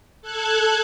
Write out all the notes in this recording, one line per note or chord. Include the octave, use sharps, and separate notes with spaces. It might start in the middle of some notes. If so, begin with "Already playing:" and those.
A4 A5 F#6 G#6